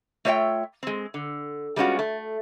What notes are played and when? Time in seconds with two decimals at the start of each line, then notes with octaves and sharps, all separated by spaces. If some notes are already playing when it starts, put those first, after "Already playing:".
0.25 A3 F4 C#5 D#5 E5 G5
0.83 G#3 C4
1.14 D3
1.76 G3 G#3 B3 C#4 F4 F#4
1.99 A3